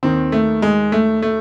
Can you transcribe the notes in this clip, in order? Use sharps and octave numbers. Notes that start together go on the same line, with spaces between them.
D#2 D#3 C4
A3
G#3
A3
A3